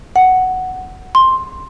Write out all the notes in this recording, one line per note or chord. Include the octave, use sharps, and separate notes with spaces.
F#5
C6